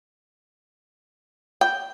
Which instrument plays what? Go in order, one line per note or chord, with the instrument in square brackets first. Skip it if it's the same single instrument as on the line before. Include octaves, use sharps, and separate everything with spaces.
[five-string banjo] G5